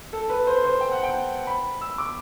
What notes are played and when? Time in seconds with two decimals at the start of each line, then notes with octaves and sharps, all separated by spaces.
0.13 A4
0.30 B4
0.47 C5
0.64 C5
0.81 G5
0.92 F#5
1.03 G5
1.47 B5
1.81 E6
1.98 D6